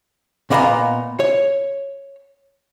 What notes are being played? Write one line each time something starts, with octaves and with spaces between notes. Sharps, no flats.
A#2 A#3 B3 D#5 F5 A#5
C#5